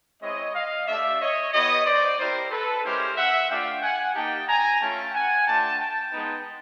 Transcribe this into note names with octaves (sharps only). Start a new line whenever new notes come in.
G#3 C4 E4 C#5 D#5
D#5 F5
A3 D4 G4 D5 E5
C#5 D#5
B3 E4 G4 C#5 D#5
C5 D5
C4 E4 G4 A#4 C5
A4 B4
G#3 C#4 E4 G4 A#4 C5
E5 F#5
A3 D4 F4 F5 G5
F#5 G#5
A#3 D#4 G4 G5 A5
G#5 A#5
A3 C#4 F4 G5 A5
F#5 G#5
A3 D4 F4 G5 A5
G5 A5
G#3 B3 D#4